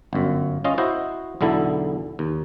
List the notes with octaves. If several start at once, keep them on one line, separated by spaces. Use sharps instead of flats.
G1 F#2
C#4 F4 D#5 F5
E4 F#4 C5 D#5
B1 E2 D3 E4 A4
D#2